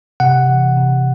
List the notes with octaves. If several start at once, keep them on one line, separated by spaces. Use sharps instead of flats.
C3 F#5
E3
C3